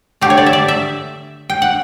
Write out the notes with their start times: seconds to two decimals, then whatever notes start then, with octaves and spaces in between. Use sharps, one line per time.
0.21 D3 A3 G4
0.30 C#5
0.38 D5
0.46 E5
0.53 D5
0.68 E5
1.50 G5
1.62 F#5